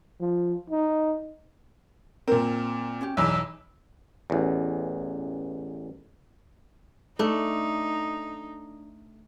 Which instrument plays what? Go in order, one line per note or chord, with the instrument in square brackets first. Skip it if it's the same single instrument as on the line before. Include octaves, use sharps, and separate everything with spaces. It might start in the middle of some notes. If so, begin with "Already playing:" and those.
[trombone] F3
D#4
[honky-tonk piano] A#2 C4 [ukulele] A#4
[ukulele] C#4 F#4 G4
[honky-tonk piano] B1 E2 [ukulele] D#4 E4 [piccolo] E6
[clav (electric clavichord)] A1 E2
[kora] A3 D4 [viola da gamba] D#4